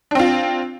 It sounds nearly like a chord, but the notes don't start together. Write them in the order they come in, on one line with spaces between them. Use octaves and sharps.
D4 C4 F4